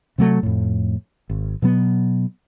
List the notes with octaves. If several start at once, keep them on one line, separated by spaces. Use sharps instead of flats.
C3 F#3 A3
F2 A2
G#1
B2 F#3 B3